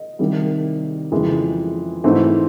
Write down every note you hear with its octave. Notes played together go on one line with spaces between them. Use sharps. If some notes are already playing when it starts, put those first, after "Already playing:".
Already playing: D#5
C2 C3 D#3 G3
F2 C#3 E3 G#3
G#2 E3 A3 C4